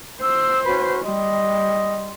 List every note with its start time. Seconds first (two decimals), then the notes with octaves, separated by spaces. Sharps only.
0.21 C5 E6
0.65 C#4 F#4 B4
1.05 G3 D#5 C6